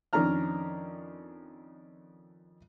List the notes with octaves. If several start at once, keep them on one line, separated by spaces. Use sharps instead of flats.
F2 D#3 C#4 D4 A#5 F6